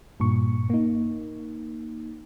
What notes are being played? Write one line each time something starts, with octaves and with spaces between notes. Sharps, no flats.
G2 A#2 C#6
A#3 D#4